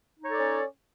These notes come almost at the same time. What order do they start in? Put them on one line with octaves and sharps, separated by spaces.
D#4 C#5 A4 D5 C#4